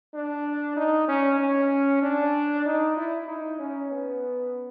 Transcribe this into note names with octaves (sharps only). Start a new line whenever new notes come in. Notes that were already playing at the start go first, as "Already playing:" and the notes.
D4
D#4
C#4
C#4
D4
D#4
E4
D#4
C#4
B3